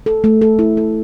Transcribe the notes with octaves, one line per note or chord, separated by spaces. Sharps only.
A4
A3
A4
E4
A4